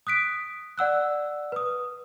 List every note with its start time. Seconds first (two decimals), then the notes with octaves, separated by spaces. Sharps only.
0.07 D#6 F#6 B6 D7
0.78 D5 F#5 E6 F#6
1.52 B4 D#6